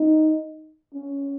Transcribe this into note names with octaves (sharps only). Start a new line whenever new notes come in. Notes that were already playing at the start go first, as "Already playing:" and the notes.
Already playing: D#4
C#4